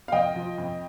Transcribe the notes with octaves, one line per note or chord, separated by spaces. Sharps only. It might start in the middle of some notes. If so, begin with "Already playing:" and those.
F5
F2 D#5 G5
F3
F2